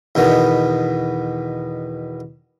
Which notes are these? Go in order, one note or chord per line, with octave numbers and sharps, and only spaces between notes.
E2 B2 D#3 B3